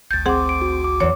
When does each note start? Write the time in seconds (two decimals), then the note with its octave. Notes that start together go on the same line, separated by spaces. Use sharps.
0.11 G#1 D2 G6 A6
0.26 C4 G#4 F#5 C6 D6
0.49 D7
0.62 F#4
0.84 D6
1.00 E2 C#5